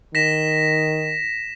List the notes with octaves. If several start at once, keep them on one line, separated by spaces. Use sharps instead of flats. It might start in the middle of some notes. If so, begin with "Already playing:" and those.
D#3 A#6 B6 E7